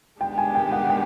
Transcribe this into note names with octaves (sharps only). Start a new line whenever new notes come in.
D#3 G#3 B3 D4 G4 G5
G#5
G5
F#5
G5